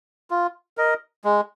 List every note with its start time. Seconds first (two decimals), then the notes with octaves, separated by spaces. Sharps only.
0.30 F4
0.77 A#4 D#5
1.24 G#3